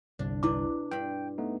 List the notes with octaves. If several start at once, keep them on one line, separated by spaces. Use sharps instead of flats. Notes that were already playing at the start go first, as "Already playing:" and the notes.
G1 C2 D4
B2 D4 E4 B4 D6
G2 G5 B5
A3 B3 D#4